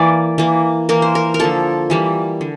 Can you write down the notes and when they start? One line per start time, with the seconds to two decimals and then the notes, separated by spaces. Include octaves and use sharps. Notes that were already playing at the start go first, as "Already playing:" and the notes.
Already playing: E3 A#3 D5
0.38 E3 A#3
0.89 E3 A#3 A#4
1.02 C5
1.15 A#4
1.34 A#4
1.39 D3 F3 A#3 A4
1.90 E3 G3 A#3
2.41 D3